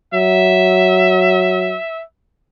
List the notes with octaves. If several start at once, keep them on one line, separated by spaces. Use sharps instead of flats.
F#3 E5